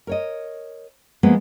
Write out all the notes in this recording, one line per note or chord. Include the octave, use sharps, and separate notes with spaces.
A#4 C#5 D#5
F3 G#3 A#3 B3